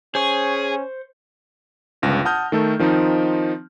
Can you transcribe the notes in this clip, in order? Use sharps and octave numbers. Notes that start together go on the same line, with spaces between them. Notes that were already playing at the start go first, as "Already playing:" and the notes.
C#4 G#4 C5 C#6
G1 C#2 A#6
F#5 A5 D#6 F6 G6
D#3 A3 A4
D#3 F3 C4 D#4